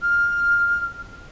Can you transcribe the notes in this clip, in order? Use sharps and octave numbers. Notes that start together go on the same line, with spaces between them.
F6